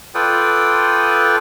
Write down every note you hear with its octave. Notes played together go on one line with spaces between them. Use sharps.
F4 A4 B4 D5 G5 D#6